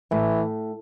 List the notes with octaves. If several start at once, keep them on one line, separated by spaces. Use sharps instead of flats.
A2 E3